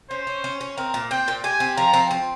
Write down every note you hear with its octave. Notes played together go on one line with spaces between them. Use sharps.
C#4 C5
C#4
C#4
C#4
C4 A#4
A#2
C4 G5
A#2
G4 G#5
C4
F3 A#5
C4
C4